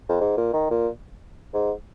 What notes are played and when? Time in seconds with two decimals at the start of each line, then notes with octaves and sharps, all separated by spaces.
0.09 F2
0.20 G#2
0.37 A#2
0.53 D#3
0.70 A#2
1.53 G#2